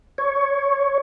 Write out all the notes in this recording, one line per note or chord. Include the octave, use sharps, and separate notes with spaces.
C#5